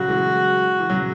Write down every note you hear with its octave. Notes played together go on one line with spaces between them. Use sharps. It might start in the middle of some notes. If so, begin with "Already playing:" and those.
Already playing: C#3 F#3 F#4
E3 G#3
E3
C#3 F#3